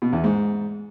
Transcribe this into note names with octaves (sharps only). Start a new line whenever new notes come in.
B2
E2
G#2